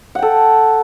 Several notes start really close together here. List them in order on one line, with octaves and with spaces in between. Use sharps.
F#5 G5 A4